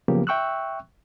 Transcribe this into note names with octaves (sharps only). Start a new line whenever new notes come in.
C#3 F3 F#3 A#3 B3 G4
E5 G5 C#6 E6 F#6